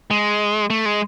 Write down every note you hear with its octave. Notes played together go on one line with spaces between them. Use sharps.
G#3
A3
G#3